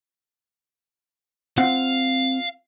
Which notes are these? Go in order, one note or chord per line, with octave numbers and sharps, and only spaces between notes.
C4 F4 F5 F#5